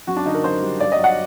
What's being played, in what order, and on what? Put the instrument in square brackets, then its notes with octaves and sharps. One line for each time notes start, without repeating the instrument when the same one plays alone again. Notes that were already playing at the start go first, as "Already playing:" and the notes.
[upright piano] F#2 F#4
D4
D3 D#4
A#4
F#2 C5
G3
G2 D5
D#5
F#3
F#5